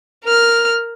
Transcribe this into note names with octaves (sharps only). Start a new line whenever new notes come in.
A#4 F6